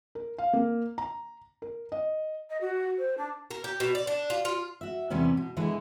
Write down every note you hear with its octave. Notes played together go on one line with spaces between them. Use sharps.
A#4
F5
A#3
A#5
A#4
D#5
D#5
F#4
C5
D4
A#4
G4
B2
D5
D4
F4
F4
F#4 E5
E2 C3 G3 B3 C#4
B2
D3 E3 G#3 B3